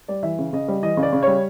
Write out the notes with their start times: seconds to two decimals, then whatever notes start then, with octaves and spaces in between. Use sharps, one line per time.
0.08 G3 D5
0.23 E3 E5
0.38 C#3
0.53 C#3 D#5
0.68 G3
0.82 E3 D#5
0.97 C#3
1.03 D5
1.13 C#3
1.23 G3 C#5